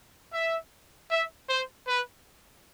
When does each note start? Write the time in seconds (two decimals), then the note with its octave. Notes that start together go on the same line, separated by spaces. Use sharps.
0.33 E5
1.10 E5
1.50 C5
1.88 B4